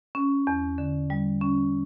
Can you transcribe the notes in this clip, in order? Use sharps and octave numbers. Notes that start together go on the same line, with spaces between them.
C#4
E2
D3
G3
C#4